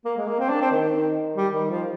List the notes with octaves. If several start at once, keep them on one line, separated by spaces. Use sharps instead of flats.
A#3
G#3
A#3
C4
D4
C4
D#3
G3
D#3
F3